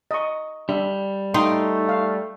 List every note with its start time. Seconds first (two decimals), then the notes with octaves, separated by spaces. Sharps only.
0.11 D#5 C#6
0.69 G3 D4 E5
1.34 A3 D#4 F5 G5 C6
1.89 F5